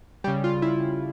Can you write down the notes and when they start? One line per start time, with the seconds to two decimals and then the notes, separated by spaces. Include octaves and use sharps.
0.24 C#3 G3 G4
0.44 F4
0.62 E4